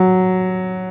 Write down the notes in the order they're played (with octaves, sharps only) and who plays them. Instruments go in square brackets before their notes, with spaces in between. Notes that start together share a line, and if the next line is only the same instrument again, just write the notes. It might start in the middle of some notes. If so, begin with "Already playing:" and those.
Already playing: [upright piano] F#3